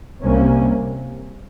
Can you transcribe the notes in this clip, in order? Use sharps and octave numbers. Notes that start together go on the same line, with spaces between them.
C2 C3 G3 A#3 C#4